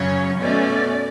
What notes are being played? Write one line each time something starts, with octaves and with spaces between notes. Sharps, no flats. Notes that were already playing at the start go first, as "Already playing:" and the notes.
Already playing: F#2 C#3 F#3 C#4 C#5
B2 A3 C#4 D5